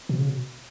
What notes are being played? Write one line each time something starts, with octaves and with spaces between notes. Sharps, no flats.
B2
C#3
B2